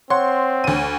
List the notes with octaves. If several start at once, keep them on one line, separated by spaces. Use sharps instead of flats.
C4 C#5 F#5 C6
D2 D#7